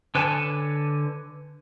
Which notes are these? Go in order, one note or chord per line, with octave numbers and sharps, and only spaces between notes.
D3 B4 C#5 G#5 A5